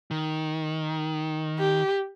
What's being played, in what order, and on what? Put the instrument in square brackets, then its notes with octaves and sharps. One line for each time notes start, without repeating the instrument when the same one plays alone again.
[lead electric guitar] D#3
[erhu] G4